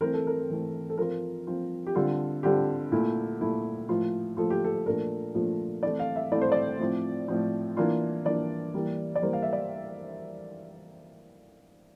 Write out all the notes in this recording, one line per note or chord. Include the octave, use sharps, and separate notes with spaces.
E3 A3 C4 A#4
A4
A#4
E3 A3 C4
A4
F3 C4 F4 A#4
F3 C4 F4
G4
D3 G3 C4 F4 A4
D3 G3 C4 F4 G4
A#2 A3 E4
A#2 A3 E4
A2 F3 A#3 F4
A2 F3 A#3 F4 A4
G4
A4
A#2 F3 A3 D4 F4 A#4
A#2 F3 A3 D4 F4
E3 A3 C4 E4 D5
F5
E5
E3 A3 C4 E4 D5
C5
D5
A2 F3 C4
A2 F3 C4
E3 A#3 D4 F4
E3 A#3 D4 F4 D5
E3 G3 A#3
D5
E3 G3 A#3 C5
F5
E5
D5